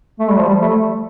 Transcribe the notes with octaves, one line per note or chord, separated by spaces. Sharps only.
A3
G3
F3
G3
A3